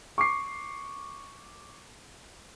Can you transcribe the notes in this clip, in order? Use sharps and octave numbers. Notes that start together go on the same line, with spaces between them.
C#6 D6 C7